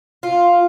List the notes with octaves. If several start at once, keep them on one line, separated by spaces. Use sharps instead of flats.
F4